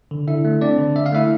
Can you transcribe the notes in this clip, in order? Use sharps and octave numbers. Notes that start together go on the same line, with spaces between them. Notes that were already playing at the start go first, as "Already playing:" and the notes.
D3
D3 E4 E5
A3
C4 D4 D5
D3
D3 E5
F5
A3 E4 E5